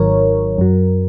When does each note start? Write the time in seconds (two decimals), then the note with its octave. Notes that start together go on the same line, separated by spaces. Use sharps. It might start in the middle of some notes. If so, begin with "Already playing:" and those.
Already playing: G#1 G#2 D#3 F#3 A#4 C#5
0.58 F#2 F#3